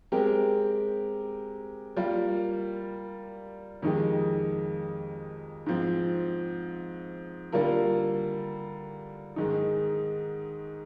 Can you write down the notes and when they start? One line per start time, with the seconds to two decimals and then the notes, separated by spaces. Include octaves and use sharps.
0.12 G#3 C4 G4 A#4
1.96 G3 A#3 F4 A#4
3.82 F2 D#3 G#3 D#4 G4
5.66 G#2 F3 C4
7.52 D3 G3 A#3 F4 A#4
9.36 G#2 D#3 G#3 D#4